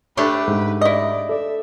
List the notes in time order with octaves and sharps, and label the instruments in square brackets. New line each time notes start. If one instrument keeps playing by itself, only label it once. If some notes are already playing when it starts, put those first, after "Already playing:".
[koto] A3 D4 G4 [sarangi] B4
[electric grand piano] G#2
[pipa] E4 D#5 [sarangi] D5
[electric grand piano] A4 D5 [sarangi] E5